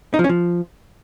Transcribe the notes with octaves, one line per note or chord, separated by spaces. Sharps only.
D#4
F3
C#4
F3